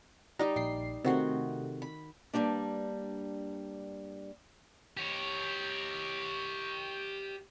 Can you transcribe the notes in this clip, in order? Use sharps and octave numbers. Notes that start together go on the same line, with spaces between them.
G3 D#4 G4 D#5 A#5
A#1 G5 C7
C3 D#3 A3 F#4 C6
B5
G2 F3 G3 A#3 D4
G4 C#5